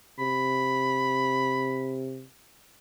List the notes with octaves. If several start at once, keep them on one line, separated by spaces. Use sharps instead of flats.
C3 B5